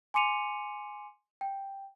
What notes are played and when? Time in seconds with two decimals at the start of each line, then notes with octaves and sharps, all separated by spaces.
0.14 G#5 C6 D6 C#7 D#7 F7
1.41 G5